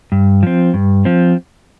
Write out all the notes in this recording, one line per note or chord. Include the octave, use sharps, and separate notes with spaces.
G2
F3 C4
G2
F3 C4